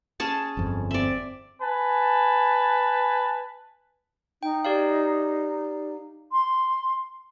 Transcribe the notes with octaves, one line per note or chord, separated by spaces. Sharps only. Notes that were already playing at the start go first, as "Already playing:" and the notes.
C#4 G#4 A5
G1 F2
C4 D5 E5
B4 G#5 A5
D#4 G5
G4 D5 F5
C6